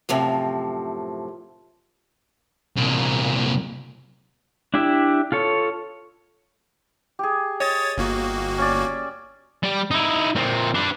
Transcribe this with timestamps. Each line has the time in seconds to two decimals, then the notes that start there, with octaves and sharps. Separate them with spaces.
0.09 F#2 A2 C3 F3
2.77 C2 A#2
4.74 D4 E4 G4 E5
5.32 F4 A4 C#5
7.19 G4 G#4
7.60 C#5 D#5 A6
7.98 G1 A#3 F#4
8.58 C#4 D5
9.63 G3
9.91 D#4 E4
10.35 A#2 C4
10.75 D4 B4